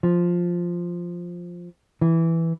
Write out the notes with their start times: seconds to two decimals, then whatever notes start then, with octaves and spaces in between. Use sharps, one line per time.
0.03 F3
2.01 E3